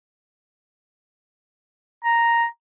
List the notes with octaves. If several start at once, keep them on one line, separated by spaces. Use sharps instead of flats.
A#5